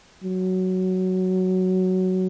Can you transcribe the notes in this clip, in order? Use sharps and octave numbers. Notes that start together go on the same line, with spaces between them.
F#3